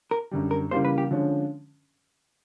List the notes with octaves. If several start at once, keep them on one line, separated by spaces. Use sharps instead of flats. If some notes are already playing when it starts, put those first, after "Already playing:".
A#4
F#2 D3 G3
A#4
C#3 E3 G3 A#3 C5
B4
G4
D3 F3 G#3 C#4